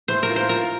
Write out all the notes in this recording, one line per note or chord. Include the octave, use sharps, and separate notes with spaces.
A2 C5
A#4
F4
C5
F4 A#4